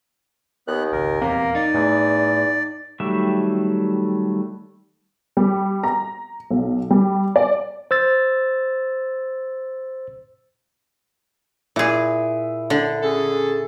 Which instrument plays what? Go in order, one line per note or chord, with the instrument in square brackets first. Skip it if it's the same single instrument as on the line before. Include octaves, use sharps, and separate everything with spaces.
[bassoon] D#2 [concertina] B3 F#6
[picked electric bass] G#1 C#2 [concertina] A#4
[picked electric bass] D#1 E2 [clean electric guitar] C3 [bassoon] A#3
[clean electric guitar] D#4 [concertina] D5
[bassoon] E2 [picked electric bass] A2
[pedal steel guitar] D#3 F#3 G3 A3 E5
[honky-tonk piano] G3
A#5
B1
G3
D5
[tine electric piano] C5 E6 A6
[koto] A#2 G#4 [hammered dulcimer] E4
[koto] D3
[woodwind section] C#4 G#4 A4